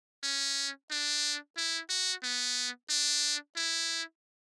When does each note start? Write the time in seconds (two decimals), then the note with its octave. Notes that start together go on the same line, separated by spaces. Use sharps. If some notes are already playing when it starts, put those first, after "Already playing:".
0.23 C#4
0.91 D4
1.57 E4
1.90 F#4
2.23 B3
2.90 D4
3.56 E4